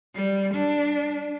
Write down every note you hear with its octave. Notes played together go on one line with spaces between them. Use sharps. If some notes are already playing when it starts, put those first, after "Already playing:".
G3
D4